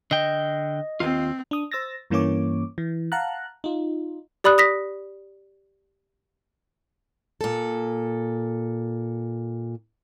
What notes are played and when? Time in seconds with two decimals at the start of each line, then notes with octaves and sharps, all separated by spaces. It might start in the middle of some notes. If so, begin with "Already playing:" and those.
0.11 D3 D#5 G5
1.00 D#2 C4 F4
1.51 D4 D#6
1.71 C5 E6 A6 A#6
2.10 G2 E3 A#3 C#4 C#5 D6
2.78 E3
3.12 F5 F#5 A5 A#5 F#6
3.64 D#4 F4
4.44 G4 D5 B5 D#6 F#6
4.58 D#6 A#6 B6
7.41 A#2 A4